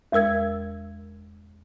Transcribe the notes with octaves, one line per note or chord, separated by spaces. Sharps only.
E2 G#3 A#4 E6 G#6